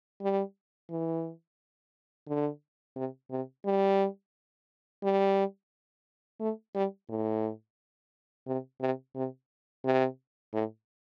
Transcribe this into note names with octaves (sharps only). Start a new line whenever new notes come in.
G3
E3
D3
C3
C3
G3
G3
A3
G3
A2
C3
C3
C3
C3
A2